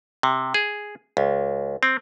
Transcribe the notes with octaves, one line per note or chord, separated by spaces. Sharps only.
C3
G#4
C#2
C4